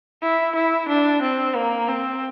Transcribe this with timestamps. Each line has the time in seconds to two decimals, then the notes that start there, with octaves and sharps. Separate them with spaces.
0.22 E4
0.55 E4
0.89 D4
1.22 C4
1.56 A#3
1.88 C4